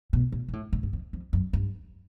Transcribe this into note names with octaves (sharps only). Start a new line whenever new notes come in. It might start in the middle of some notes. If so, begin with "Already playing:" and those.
B2
A#2
A#2
A2
A2
G2
F2
F2
F#2
G2